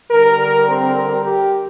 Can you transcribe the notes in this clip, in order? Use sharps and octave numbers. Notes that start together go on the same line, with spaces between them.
D3 G3 A#4
A#4
C4
A#4
G4